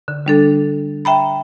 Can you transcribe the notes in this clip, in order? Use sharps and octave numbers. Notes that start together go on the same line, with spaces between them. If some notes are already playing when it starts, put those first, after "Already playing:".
D3
G3 D4 A4
E5 G5 A#5 B5